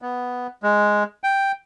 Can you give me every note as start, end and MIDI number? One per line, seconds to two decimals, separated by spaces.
0.02 0.47 59
0.63 1.03 56
1.24 1.52 79